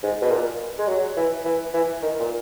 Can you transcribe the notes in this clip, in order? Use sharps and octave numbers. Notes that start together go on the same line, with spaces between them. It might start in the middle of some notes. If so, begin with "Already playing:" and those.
G#2
B2
A#2
G#3
F#3
E3
E3
E3
D#3
A#2